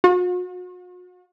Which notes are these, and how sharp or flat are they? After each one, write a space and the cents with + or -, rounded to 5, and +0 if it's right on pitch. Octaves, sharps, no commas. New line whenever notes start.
F#4 -45